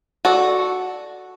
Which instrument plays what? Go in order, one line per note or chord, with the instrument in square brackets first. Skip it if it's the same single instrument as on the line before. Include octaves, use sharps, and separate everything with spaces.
[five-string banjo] F#4 A4 D5